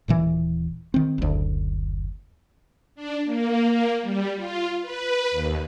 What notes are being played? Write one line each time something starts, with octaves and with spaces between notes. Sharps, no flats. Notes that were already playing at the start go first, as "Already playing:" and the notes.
D#1 A#2 E3
D#3 C4
F#1 D2
D4
A#3
A#3
G3
F4
B4
D#2